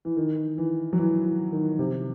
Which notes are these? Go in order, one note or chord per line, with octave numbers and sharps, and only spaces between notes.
E3
D#3
E3
F#3
E3
E3
D#3
C3